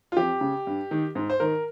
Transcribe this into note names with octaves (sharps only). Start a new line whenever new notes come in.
F4
F2 G4
C#3
G2
D#3
G#2
C5
D#3 A#4